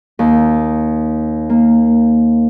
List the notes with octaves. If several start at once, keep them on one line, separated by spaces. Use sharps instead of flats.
D#2
A#3